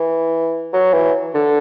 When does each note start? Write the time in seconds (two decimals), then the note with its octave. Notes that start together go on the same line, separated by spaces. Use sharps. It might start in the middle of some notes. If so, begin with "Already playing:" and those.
Already playing: E3
0.73 F#3
0.93 E3
1.35 D3